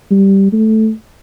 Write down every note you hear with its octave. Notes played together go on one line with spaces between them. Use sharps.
G3
A3